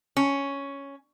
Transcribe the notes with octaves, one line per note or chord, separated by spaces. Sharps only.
C#4